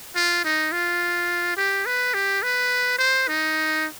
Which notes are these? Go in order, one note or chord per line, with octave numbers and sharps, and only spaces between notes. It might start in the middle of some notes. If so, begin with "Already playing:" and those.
F4
D#4
F4
G4
B4
G4
B4
C5
D#4